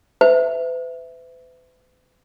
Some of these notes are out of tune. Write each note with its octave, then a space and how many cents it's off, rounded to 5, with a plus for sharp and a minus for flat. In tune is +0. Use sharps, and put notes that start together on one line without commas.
B4 +40 E5 +0